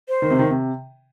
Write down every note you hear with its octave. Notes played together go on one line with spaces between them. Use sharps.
C5
D#3
C3
D#3
C3